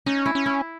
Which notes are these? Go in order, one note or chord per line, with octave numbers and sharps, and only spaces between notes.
C#4 D#4
E4
C#4
E4